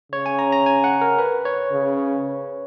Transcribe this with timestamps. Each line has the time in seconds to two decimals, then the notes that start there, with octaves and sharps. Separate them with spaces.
0.12 C#3 C#5
0.26 G#5
0.39 A#5
0.52 A#5
0.66 G#5
0.84 F#5
1.01 A#4
1.19 B4
1.45 C#5
1.72 C#3